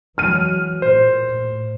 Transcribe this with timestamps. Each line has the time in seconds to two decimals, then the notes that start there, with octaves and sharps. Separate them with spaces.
0.18 E3 F#3 G#3 F6 D#7
0.82 A#2 C5
1.27 A2